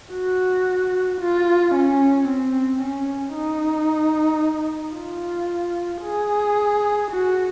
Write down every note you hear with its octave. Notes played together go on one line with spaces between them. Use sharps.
F#4
F4
C#4
C4
C#4
D#4
F4
G#4
F#4